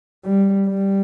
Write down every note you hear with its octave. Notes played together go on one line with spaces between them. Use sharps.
G3
G3